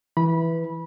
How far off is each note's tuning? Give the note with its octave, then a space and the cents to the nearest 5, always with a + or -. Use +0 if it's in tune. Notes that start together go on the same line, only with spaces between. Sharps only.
E3 +0 B4 +0 B5 -20